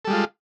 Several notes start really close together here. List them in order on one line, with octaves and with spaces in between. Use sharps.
A4 G3 G#3 F4